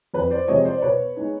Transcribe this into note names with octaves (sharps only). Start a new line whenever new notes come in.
F2 B4
C5 D5
C3 F3 G#3 C4 C#5 D#5
C5 D5
D5
B2 B4 C#5
G#3 B3 D#4